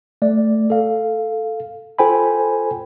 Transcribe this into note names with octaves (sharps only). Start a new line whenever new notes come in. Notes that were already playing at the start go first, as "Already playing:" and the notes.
A3 D5
A4 F5
F4 A4 C5 G5 G#5 B5